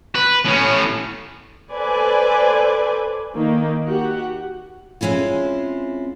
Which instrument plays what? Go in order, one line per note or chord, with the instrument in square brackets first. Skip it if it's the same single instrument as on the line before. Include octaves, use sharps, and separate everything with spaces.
[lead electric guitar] B4
A2 C#4
[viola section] A4 B4 C5 D5 G#5
D#3 A#3 D#4
F#4 G4 F#5
[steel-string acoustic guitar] G#3 C4 C#4 E4 F4